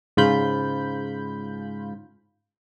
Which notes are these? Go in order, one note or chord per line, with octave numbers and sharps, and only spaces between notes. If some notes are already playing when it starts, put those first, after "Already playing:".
G#2 C#3 F4 B5 G6